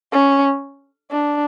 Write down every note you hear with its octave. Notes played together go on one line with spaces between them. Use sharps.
C#4
D4